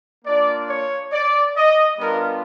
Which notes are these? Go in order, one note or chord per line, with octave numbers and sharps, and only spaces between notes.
A#3 D4 F4 D5
C#5
D5
D#5
G3 B3 D4 F4 A#4